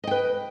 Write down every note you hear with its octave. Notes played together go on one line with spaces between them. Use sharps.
B4 D#5 G5